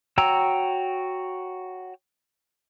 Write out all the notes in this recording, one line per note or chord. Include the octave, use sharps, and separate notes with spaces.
F#4 C#5 G5 A#5 E6